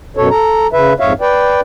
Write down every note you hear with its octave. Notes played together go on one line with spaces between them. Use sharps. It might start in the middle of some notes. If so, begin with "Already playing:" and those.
F#2 B2 A4 C#5
A4 A#5
C#3 B4 E5
F2 G#2 C#5 E5 F5
B4 D5 G5